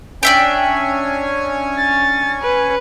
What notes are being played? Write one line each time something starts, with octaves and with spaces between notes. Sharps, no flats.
C#4 D4 C#5 E5 G5 G#5
A6
B4